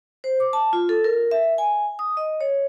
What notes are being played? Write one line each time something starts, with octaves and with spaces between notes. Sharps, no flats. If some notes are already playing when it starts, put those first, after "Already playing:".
C5
D6
A5
F4
A4
A#4
E5
G#5
D#6
D#5
C#5